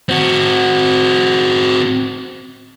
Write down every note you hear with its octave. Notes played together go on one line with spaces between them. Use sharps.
C4 F#4